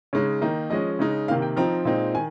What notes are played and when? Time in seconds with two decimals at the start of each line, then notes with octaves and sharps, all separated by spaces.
0.13 C#3 G#3 D#4 C#5
0.41 D#3 A#3 D#4
0.70 F3 G#3 C#4 D#5
0.99 C#3 G#3 D#4
1.28 C3 D#3 A#3 F5
1.42 G5
1.57 F3 C4 D#4 A#5
1.85 A#2 G#3 C4 D#4
2.14 D#3 G#5